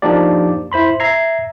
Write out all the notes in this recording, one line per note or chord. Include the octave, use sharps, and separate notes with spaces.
F3 A#3 D4 D#4 G4 D5
E4 C5 B5 C6
E5 A#5 G#6 C7